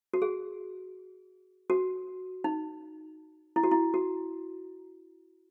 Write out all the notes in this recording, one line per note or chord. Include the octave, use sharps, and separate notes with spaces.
F#4
G#4
F#4
D#4
E4
F#4
E4
F#4